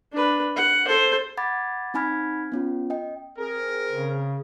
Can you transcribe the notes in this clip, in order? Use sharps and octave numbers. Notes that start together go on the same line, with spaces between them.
D4 B4
F#5
A4 C5
F#5 B5 D6 G#6 A6
C4 D#4 G#5 B5 F6 G#6
B3 C#4 F4
D#5 G5
C4 G#4 A#4
C#3